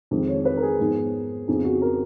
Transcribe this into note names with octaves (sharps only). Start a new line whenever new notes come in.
F2 D#3 G#3
C#5
B4
A#4
G#4
G#2 F3 B3 D#4
F2 C#3 F3 B3 D#4 G#4
F#4
A#4